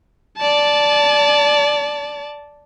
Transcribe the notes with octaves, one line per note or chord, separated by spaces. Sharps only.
D5 A5